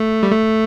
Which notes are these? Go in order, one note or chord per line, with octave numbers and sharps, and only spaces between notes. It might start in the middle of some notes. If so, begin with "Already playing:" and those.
Already playing: A3
G3
A3